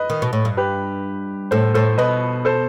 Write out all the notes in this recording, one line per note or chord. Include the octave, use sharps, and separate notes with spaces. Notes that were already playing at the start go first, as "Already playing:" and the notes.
Already playing: B4 D#5
D#3
B2
A2
G2
G4 B4
A2 A4 C5
A2 A4 C5
B2 B4 D#5
A4 C5